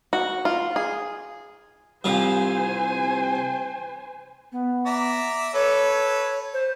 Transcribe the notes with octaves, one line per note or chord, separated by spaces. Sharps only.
F#4
F4
G#4
C2 F3 C5 F5 G#5
B3
D5 E5 A#5
A4 B4 C#5
C5